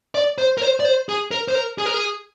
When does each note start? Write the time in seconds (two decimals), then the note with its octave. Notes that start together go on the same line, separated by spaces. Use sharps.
0.15 D5
0.38 C5
0.58 A#4
0.61 C5
0.80 D5
0.85 C5
1.09 G#4
1.31 A#4
1.48 C5
1.55 A#4
1.78 G#4
1.86 A#4
1.94 G#4